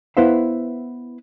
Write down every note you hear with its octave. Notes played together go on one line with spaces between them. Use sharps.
B3 E4 B4 C5 E5 F5